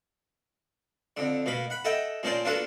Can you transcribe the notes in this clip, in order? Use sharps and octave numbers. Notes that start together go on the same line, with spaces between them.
F2 D3
B2 A#3 B5
F#5 B5
A4 D#5 E5 F#5 G5
A#2 F3 A#3 C#4 C5 D5
A#3 B3 D4 F4 F#4 A4